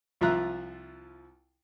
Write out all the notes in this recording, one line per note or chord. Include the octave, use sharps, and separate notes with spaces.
C2 F3 F4 E5 A#5 F#6